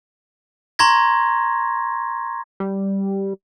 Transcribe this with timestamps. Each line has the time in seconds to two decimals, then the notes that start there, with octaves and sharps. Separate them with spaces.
0.79 A#5 C6 C#6 G#6 A#6
2.60 G3